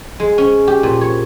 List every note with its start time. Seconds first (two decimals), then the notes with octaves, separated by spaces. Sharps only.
0.20 G#3
0.38 C#4
0.68 G4
0.83 A#2
1.01 C#5